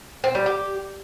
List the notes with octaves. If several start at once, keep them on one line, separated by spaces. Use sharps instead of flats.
C4
G3
G4